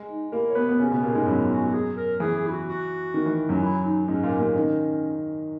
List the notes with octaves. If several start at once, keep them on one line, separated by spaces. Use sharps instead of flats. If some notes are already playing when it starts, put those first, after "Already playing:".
Already playing: G#3
D#4
A#3 E4 A#4
C#5
B3 B4
B3
C#3 C#4 F#4
B2 B3
A#2 A#3 G#4
G#2 G#3
F#2 F#3 E4
F#4
F#4
G#4
A#4
E3 G#4
G#4
E4
F#4
F#4
D#3
E3
F#2 F#3
E4
D#4
G#2 G#3 C#4
A#2 A#3
A#2 A#3
D#3 C#4 D#4